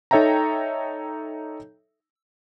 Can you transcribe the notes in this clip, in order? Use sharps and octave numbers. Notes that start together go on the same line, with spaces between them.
D#4 A4 C#5 E5 G5 A#5